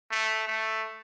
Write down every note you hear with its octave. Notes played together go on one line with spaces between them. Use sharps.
A3
A3